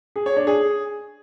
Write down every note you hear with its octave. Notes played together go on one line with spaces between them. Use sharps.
G#4
C#5
D4
G#4